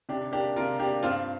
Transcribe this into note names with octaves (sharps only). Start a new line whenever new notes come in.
C3 D4 G4
A#3 D4 G4
C3 F4 A#4
A#3 D4 G4
G2 C4 F4